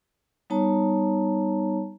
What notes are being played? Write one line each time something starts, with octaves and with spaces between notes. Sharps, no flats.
G3 B3 D#4 C#5 A5 A#5